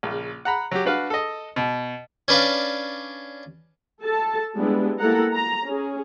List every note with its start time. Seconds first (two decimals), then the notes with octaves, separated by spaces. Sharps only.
0.03 A#1 C#3
0.45 F#5 A#5 B5
0.71 F#3 G4
0.85 D4 F#4 B4 F5
1.10 A4 D#5
1.56 B2
2.28 C#4 D4 B4 D5 F5
4.02 A4 A5
4.56 G3 G#3 B3 D4 E4
4.99 A#3 E4 G4 A4 F#5 A#5
5.33 A#5
5.66 C#4 G#4